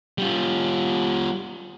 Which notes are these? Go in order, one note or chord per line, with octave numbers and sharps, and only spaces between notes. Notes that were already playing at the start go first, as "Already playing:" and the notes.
G3 F4